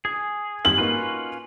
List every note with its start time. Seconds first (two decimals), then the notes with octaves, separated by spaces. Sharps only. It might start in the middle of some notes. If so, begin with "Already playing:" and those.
0.05 G#4 G#5
0.65 G#1 G3 F#7
0.78 A#3 C#4 D#4 F4 F#4 B4